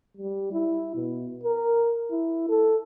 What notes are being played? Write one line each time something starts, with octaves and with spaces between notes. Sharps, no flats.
G3
E4
B2
A#4
E4
A4